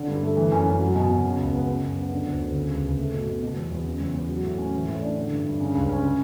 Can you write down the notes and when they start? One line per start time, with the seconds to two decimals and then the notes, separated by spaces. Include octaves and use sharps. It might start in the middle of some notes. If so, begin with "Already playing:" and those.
Already playing: D3
0.08 G2
0.23 A3
0.37 E3
0.52 F#2
0.66 F#2
0.80 F#3
0.95 B2
1.10 B2
1.24 C#3
1.39 C#2
1.53 B3
1.68 C#3
1.83 F#2
1.97 B3
2.12 D3
2.26 D2
2.41 D2
2.55 C#3
2.70 C#2
2.84 C#2
2.99 A3
3.13 B2
3.27 B2
3.43 B2
3.56 E2
3.71 E2
3.86 C#3
4.00 E2
4.14 E2
4.29 F#3
4.43 A2
4.58 C#4
4.73 E3
4.87 A2
5.02 D4
5.17 D3
5.31 G2
5.45 G2
5.61 C#3
5.75 C#2
5.89 C#4
6.04 C#3